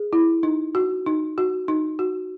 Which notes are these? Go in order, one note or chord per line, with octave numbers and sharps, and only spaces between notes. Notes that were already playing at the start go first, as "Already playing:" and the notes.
Already playing: G#4
E4
D#4
F#4
D#4
F#4
D#4
F#4